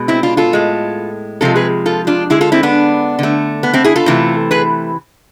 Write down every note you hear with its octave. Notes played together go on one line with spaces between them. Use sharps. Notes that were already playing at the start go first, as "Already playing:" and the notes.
Already playing: B2 G#3
C4 E4
D4 F4
F4 A4
A2 G#3
C3 F3 G#3 F4 A4
G#4 B4
F4 A4
D4 F4
D3 G#3 E4 G#4
F4 A4
C4 E4
B3 D4
D3 A3
B3
A3 C4
E4 G#4
F4 A4
C3 E3 A3
G#4 B4